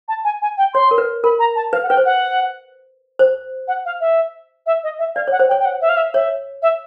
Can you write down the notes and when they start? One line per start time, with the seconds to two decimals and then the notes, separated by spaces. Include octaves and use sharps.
0.08 A5
0.24 G#5
0.42 G#5
0.58 G5
0.74 C#5 C6
0.91 A#4
0.98 B4
1.24 A#4 B5
1.39 A#5
1.56 A5
1.73 B4 F5
1.83 F#5
1.89 B4 G5
1.97 C5
2.05 F#5
3.19 C5
3.68 F#5
3.85 F5
4.01 E5
4.66 E5
4.83 D#5
4.99 E5
5.15 D5 F5
5.28 C#5 F#5
5.40 C5
5.49 G5
5.51 C#5
5.59 G5
5.65 F#5
5.81 E5
5.89 F5
5.97 E5
6.13 C#5 E5
6.62 E5